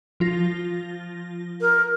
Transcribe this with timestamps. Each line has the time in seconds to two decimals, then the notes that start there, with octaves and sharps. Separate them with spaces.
0.20 F3 F4 A#6
1.61 A#4